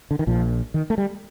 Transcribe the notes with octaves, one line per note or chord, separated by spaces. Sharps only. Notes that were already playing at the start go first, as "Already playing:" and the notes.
D3
D#3
A#1 A#2 F3
D#3
A3
G3